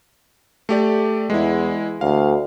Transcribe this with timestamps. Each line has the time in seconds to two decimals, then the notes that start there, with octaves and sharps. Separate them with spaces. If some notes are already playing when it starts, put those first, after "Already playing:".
0.69 A3 G4 D5
1.30 E2 G#3 E4
2.01 D2 F5